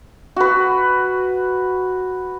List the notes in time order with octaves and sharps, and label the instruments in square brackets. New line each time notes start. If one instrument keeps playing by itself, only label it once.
[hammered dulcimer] F#4 B4